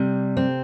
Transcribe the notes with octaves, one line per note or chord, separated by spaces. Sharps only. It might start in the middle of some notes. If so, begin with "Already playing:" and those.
Already playing: C3 G3
C4